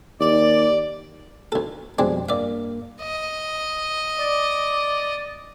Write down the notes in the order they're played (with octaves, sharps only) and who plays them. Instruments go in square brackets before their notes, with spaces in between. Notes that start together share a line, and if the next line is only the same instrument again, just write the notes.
[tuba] D#2 [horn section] D5
[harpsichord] D2 A4
[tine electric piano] F2 B2 G3 [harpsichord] G#3 C4 D4
[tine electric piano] G2 A#3 [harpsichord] D5 E5
[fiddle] D#5
[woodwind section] D5